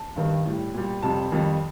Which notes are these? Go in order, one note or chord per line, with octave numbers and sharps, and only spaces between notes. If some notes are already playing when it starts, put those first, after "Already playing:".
Already playing: A5
G2 D#3 G3
A2 G3
A#2 G3
F2 C3 G3 A5
F2 D#3 G3